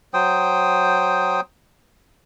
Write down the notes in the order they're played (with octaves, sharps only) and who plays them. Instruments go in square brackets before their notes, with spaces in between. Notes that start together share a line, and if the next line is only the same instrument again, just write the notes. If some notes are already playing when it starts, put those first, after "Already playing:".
[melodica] F#3 C5 G5 D#6